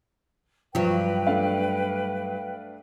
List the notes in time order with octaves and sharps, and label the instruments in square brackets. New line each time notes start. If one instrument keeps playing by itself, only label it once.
[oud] G2 F#3 [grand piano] F3 [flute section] B4 G5
[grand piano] A3 D4 F5